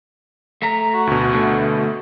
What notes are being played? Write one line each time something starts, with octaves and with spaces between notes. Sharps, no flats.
A3 E5 A#5
F#4
D2 B2
D3 A3